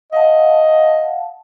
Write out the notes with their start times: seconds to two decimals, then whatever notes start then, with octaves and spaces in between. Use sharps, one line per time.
0.13 D#5 F5 F#5 A5